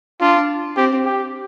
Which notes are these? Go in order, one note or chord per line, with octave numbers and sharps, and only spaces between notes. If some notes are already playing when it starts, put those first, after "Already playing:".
D4 F4
C4 G4
G4